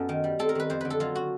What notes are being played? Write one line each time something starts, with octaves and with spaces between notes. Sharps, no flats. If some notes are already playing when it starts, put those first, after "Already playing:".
Already playing: F#2 B3 A4
D#3
G3
C4 A4
A#4
D#3 B4
F2 C5
D3 B4
A4
F#3 F4
F#4